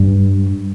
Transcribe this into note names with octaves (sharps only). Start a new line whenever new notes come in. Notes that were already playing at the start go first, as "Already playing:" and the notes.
Already playing: G2